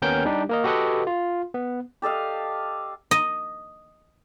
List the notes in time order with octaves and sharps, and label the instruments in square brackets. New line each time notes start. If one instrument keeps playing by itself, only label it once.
[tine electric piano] D#2 B3 C#4 A#4 G5 G6
G3 D4 D#4 G4
A#3 A#4 D#5
F#4 G4 A4 B4 D#5 F#5
F4
B3
[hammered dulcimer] G4 A4 D#5 F5
[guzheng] D#5